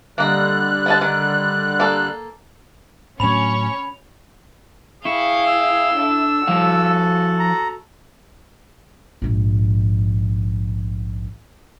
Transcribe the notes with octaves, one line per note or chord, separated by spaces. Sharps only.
D3 G3 A#3 D#5 F#6
B3 D#5 A5
D#3
A#3 A4
A2 F#3 C#4 C#5 B5 C#6 F7
E4 G#4 F5 G5 C#6
E6
D4 A4
F3 E4 F#4 A4 F5
A#5
A#1 G#2